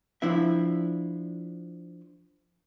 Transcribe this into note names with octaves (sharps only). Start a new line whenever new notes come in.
F3 D4 E4 E5